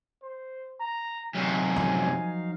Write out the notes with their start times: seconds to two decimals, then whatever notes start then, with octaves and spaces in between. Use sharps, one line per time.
0.22 C5
0.80 A#5
1.35 F#2 C3 F#3 D#4 F5 G#5
1.76 D#3 F3